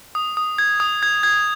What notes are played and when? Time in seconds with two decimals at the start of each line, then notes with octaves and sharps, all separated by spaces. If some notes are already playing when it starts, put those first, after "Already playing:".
0.15 D#6
0.37 D#6
0.58 G#6
0.80 D#6
1.03 G#6
1.23 G#6